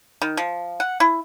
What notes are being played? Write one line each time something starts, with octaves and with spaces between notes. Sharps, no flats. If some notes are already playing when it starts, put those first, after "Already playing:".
D#3
F3
F#5
E4